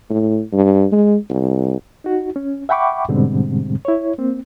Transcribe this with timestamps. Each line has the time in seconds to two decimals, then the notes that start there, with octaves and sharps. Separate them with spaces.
0.10 A2
0.53 G2
0.92 G#3
1.30 C2
2.04 D#4 F#4
2.36 C#4
2.69 E5 F#5 G5 B5 C#6 D6
3.09 G#2 B2 D3 G3 G#3 C4
3.85 E4 C#5
4.18 A#3 C4